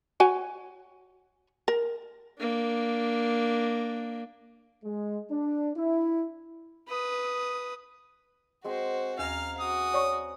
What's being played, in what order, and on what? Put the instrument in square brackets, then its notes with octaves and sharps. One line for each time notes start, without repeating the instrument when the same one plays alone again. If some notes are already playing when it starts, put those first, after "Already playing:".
[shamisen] F#4 C#5 G#5
A#4
[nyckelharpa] A#3 D4
[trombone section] G#3
D4
E4
[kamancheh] B4 D#6
[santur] G#3 C4 G#4 [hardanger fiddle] F#4 C5
[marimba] D#2 [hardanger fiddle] F5 [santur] G#5 A#5 [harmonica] F6
[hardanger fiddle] F#4 [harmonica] D#6
[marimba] C#5 D5 C#6